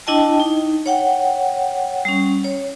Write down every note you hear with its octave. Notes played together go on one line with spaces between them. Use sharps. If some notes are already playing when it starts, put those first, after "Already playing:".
D4 E4 D#5 G5 A5
D#4
C#5 F#5 G5
G3 C#4
C#5